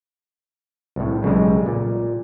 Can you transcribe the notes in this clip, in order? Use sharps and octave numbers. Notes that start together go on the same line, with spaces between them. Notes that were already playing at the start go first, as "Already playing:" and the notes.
C2 A2
B1 C#3 G3 G#3
A#2